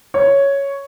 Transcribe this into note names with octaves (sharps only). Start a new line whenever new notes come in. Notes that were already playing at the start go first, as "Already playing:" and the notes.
C#5